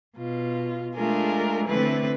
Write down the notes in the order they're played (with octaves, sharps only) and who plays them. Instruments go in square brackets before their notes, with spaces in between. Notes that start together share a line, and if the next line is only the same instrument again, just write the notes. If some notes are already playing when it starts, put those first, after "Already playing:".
[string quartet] B2 F4
G#3 A3 D4 F4 G#4 A#4
D3 A3 C4 E4 B4